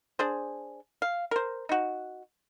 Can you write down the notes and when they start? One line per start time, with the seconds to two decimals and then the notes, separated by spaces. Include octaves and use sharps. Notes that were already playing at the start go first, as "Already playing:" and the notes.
0.19 D4 G#4 C5
1.02 F5
1.31 A#4 C5
1.69 D#4 F#4